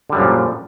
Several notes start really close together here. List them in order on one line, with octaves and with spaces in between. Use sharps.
D3 G3 F#2 F3 A#2